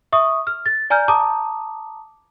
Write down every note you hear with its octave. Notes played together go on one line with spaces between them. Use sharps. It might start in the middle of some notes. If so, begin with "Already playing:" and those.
E5 C#6 D#6
F6
A6
D5 G#5 A#5 F6 G6
A5 A#5 D6 D#6